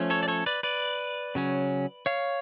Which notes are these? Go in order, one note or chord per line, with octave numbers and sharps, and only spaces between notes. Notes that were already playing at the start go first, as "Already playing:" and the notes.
Already playing: F3 A3 C#4
A4 C#5
D5
A4 C#5
B4 D5
B4 D5
C#3 F#3 C#4
C#5 F5